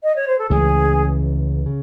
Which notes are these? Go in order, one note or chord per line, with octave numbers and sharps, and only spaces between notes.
D#5
C#5
C5
A4
C#2 C#3 E3 A3 G#4
C#3